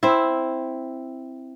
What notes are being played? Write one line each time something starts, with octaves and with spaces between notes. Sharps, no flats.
C4 E4